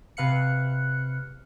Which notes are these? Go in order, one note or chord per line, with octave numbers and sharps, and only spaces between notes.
C3 B4 F5 F#6 C#7